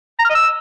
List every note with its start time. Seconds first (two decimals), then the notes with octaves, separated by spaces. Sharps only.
0.19 A#5
0.25 F6
0.30 D#5
0.35 E6